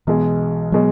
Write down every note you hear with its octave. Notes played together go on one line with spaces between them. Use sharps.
B1 B2 E3 G#3
B2 F#3 G#3